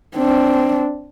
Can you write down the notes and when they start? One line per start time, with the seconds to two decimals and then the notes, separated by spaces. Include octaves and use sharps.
0.16 C4 D4